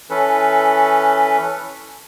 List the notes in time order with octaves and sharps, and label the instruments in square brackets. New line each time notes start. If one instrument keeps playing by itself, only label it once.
[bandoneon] E3 C#4 A4 B4